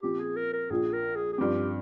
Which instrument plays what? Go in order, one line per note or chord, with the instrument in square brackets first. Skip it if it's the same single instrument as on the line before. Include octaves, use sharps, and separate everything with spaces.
[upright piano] A#2 F3 C4 [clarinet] G4
[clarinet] G#4
A#4
A#4
[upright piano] A#1 A#2 F3 [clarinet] G#4
[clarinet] A#4
G#4
G#4
[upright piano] G2 F3 C4 [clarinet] G4